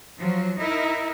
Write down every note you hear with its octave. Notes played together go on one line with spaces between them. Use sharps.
F3 F#3
D#4 E4 A#4